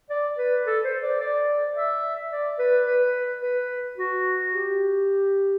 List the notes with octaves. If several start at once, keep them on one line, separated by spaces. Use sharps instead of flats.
D5
B4
A4
C5
D5
D5
E5
D5
B4
B4
B4
F#4
G4